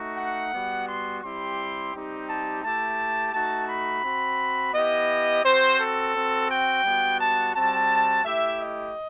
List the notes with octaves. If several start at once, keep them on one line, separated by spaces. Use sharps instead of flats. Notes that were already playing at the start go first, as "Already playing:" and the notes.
Already playing: A3 D#4 F#4
F#5
G3 B3 F#4
C6
G3 C4 E4 G4 C6
G3 C4 D#4 G4
A5
A3 E4 G4 A5
A3 D#4 F#4 A5
B5
C4 F#4
B3 E4 G4 D#5
C4 F#4 C5
A4
C4 F#4
G5
G3 B3 F#4
A5
G3 C4 F#4 A5
A3 E4 G4 E5
D#5